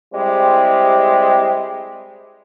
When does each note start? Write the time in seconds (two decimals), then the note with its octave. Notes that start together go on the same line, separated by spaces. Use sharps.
0.13 G3 G#3 C4 E4 G4